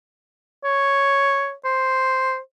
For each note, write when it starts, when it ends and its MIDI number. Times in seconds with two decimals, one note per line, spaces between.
0.64 1.53 73
1.65 2.38 72